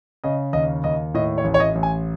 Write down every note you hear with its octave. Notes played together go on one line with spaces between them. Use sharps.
C#3 D#5
D#2 D#5
D#2 D#5
A2 D#5
C#5
A1
C#5
D#5
A1
G#5